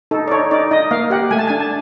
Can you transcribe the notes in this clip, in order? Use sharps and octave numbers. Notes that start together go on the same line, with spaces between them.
D#4 A4
D5
D#4 C#5
D#4 D5
D#4 D#5
A#3 F5
G4 F#5
A3 G#5
A5
D4 G#5
A5